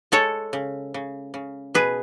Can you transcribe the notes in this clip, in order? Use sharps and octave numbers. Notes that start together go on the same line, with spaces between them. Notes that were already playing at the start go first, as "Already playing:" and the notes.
G#3 A4 C#5
C#3
C#3
C#3
B2 G#4 B4